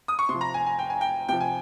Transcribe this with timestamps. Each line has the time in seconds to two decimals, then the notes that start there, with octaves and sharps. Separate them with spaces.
0.08 D#6
0.19 C#6
0.29 C3 F3 C6
0.41 A#5
0.54 G#5
0.66 G#5
0.79 G5
0.90 G#5
1.01 G5
1.29 C3 F3 G5
1.41 G#5